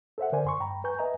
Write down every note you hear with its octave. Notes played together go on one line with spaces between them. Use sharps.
A4 C5 E5 F#5
D3 A#4 C5 D5 G#5
F#2 C6 C#6
G2 G5 A#5 B5
B4 G#5 A#5 C#6 G6
B4 D#5 E5 G#5 A#5